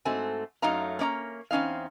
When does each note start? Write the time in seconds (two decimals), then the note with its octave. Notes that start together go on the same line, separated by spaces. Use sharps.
0.05 G#2 A3 C4 F#4 G#5
0.62 F#2 F#3 A3 D#4 F5 A#5
0.99 A#3 C#4 D5 A#5
1.51 E2 C4 C#4 D#4 F5